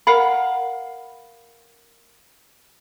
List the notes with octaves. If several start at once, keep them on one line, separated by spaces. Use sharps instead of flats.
A#4 F5 F#5 B5